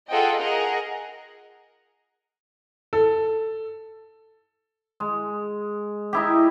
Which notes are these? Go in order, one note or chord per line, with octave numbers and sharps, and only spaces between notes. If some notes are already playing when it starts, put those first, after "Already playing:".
F4 G#4 A4 D#5 F#5 G5
G#4 A#4 D#5 F#5 A#5
A4
G#3
D#4 E4 G4